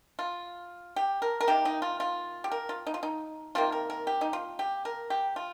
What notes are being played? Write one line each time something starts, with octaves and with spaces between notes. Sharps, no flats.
F4
G4
A#4
A#4
C3 D#3 A#3 G4
D#4
F4
F4
G4
A#4
F4
D#4
F4
D#4
C3 D#3 A#3 F4
A#4
A#4
G4
D#4
F4
G4
A#4
G4
F4